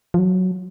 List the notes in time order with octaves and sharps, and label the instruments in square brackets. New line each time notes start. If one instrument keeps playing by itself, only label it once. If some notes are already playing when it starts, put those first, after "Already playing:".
[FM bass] F3
F#3